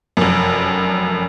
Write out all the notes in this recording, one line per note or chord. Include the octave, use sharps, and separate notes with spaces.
F1 F#2